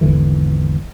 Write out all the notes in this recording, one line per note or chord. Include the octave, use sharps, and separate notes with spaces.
G#1 E2 D3 E3